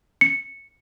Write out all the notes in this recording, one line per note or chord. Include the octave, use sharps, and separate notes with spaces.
C#7